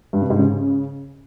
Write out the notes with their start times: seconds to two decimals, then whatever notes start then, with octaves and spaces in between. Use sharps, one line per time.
0.13 G2
0.22 C3
0.30 G#2
0.39 C#3